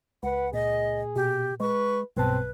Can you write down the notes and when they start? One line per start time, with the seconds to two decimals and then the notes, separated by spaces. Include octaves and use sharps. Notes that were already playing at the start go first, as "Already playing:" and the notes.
0.23 C#2 B4 F#5
0.53 A#2 G#4 D#5
1.16 B2 G4
1.60 G#3 B4 C#6
2.17 B1 G2 B2 C4 B4 A5